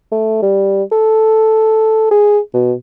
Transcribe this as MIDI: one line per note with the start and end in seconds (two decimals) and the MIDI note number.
0.12 0.40 57
0.42 0.83 55
0.92 2.11 69
2.11 2.39 68
2.54 2.73 47